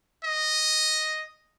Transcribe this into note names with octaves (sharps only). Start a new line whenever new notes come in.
D#5